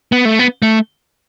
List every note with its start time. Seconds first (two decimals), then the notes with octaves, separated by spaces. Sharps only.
0.12 B3
0.25 A3
0.39 B3
0.62 A3